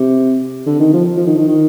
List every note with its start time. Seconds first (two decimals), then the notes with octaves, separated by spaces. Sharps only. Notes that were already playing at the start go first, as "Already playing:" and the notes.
Already playing: C3
0.66 D3
0.79 D#3
0.93 F3
1.17 F3
1.27 D#3
1.37 D#3
1.47 D#3